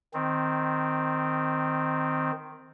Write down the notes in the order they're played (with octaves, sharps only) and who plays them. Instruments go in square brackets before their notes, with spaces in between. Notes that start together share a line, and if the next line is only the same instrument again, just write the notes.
[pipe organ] D#3 C4